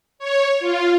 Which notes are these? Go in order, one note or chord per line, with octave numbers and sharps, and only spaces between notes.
C#5
F4